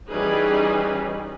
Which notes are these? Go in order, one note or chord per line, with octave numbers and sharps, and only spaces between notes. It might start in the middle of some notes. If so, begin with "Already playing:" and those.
E3 G3 C#4 D#4 G#4 B4